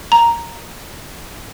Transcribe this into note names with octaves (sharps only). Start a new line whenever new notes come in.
A#5